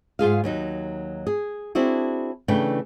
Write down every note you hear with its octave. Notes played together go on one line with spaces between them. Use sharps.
G#2 F4 G#4 F5
D#2 F#3 D#4
G#4
C4 D4 E4 F#4 G#4
C#3 E3 A3 D4 G5